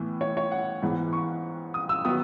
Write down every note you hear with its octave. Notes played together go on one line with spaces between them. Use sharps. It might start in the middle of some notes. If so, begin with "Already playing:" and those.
Already playing: A2 E3 B3
C#5
C#5
F#5
G#2 E3 B3
C#6
D#6
E6
D#3 F#3 B3 D#6